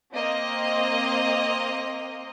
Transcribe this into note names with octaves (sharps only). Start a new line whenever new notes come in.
A#3 C4 D#5